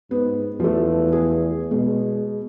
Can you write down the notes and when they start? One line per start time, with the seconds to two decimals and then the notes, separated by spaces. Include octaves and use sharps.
0.11 G#2 B3
0.60 E2 F3 A3
1.12 G#4
1.71 B2 G#3